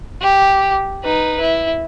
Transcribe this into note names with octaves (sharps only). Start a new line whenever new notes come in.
G4
D#4 B4
E4